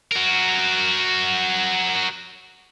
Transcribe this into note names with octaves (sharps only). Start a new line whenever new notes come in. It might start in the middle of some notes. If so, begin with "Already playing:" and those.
F#4 A#4